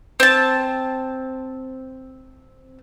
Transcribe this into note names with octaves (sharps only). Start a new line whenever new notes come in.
C4 A5